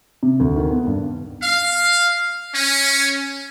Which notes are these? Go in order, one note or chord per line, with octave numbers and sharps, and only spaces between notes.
C3
D2
D#3
B3
G2
F5
C#4